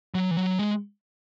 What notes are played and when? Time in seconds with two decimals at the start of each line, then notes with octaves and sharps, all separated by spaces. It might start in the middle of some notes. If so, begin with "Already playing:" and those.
0.15 F#3
0.31 E3
0.37 F#3
0.59 G#3